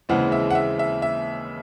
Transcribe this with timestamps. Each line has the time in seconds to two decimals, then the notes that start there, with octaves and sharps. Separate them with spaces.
0.09 D#2 C#3 E3 G#3 C4 F#5
0.32 E5
0.50 F#5
0.55 E5
0.79 E5
1.02 E5